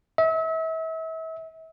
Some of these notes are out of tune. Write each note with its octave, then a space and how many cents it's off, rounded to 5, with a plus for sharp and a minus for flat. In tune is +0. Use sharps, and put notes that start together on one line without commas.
E5 -35